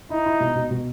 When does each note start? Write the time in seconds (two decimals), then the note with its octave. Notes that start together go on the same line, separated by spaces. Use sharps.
0.10 D#4 E4
0.26 E4
0.40 B2
0.55 B2
0.71 B2